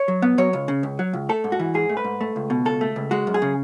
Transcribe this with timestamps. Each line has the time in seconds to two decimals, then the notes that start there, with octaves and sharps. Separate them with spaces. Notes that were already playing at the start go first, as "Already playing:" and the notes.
Already playing: C#5
0.08 F#3
0.22 B3
0.38 F#3 C#5
0.53 C#2
0.68 C#3
0.83 C#2
0.99 F#3
1.13 C#2
1.29 A3 A4
1.44 G#2
1.52 F#4
1.59 E3
1.74 G#2 G#4
1.89 A3
1.97 B4
2.04 G#2
2.21 A3
2.36 C#2
2.50 B2
2.65 C#2 A4
2.81 A3
2.96 C#2
3.11 G#3 F#4
3.27 F#2
3.34 G#4
3.42 C#3